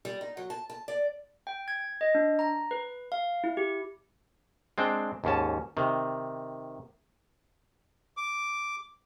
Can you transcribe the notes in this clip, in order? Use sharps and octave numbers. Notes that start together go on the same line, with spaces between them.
G3
D#4
F#3
A5
A5
D5
G5
G#6
D#5
D4
A#5
B4
F5
E4
G4
G#3 C4 D4 G5
D#2 G#2 C#4 A5
C3 D#3
D6